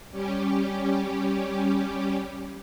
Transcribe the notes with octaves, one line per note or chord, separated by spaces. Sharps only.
G3 C#4 G4